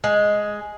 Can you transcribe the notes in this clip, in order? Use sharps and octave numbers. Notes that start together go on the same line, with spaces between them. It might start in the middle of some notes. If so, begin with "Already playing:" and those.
G#3